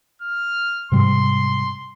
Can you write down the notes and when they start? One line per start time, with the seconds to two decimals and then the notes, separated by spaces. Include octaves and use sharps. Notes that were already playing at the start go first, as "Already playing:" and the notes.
0.22 F6
0.92 G#2 C3 G3 C6